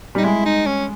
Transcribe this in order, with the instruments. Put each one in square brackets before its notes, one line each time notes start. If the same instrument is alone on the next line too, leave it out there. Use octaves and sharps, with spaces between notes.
[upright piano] G3 [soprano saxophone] D#4
[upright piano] G#3 [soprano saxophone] E4
[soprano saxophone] D#4
C#4